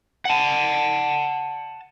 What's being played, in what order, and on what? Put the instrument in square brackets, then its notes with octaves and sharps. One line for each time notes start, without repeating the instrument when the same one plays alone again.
[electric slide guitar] F#5 A5